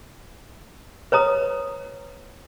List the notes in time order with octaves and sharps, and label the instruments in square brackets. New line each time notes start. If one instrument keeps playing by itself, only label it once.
[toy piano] B4 C#5 A#5 D#6